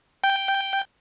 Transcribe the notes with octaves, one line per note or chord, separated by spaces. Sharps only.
G5 G6